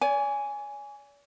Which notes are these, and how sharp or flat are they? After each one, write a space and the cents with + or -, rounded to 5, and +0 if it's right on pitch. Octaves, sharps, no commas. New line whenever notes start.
D5 -45 G#5 +0